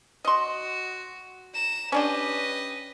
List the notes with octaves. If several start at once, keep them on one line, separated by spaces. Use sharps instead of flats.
F#4 D#5 C6
A#5 E7
C#4 D4 G4 B4 D#5